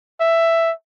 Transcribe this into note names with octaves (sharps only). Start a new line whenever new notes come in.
E5